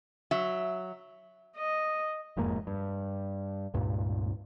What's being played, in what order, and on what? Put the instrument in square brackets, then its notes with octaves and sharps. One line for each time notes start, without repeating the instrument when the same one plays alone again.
[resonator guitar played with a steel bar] F#3 E5
[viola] D#5
[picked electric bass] E1 F2 G#2 A#3
G2
C#2 G2 A#2